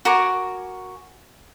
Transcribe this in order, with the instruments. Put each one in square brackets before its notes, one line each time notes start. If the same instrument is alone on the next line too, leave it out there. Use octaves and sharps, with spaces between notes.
[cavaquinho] F#4 A#4 G#5 D6